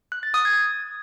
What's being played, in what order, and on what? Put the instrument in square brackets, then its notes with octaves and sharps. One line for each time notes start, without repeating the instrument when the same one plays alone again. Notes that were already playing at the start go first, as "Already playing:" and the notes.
[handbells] F#6
A6
D#6
G#6